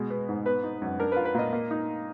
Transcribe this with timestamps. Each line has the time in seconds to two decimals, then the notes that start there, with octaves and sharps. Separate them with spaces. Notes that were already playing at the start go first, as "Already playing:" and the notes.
Already playing: B2 G#3
0.10 B3
0.29 G#2
0.46 B3 B4
0.63 D#4
0.82 F#2
0.99 D4 A#4
1.12 B4
1.16 F4
1.25 B4
1.35 A#2 D#5
1.53 A#3
1.71 D#4